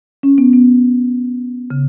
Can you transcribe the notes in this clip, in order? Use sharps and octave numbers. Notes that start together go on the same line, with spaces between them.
C#4
B3
B3
C#3